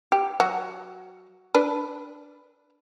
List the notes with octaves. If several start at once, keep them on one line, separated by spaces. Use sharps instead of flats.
G4
F#3 F#4
D4 B4